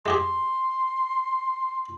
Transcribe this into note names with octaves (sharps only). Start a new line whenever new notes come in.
G#3 G4 G#4 C6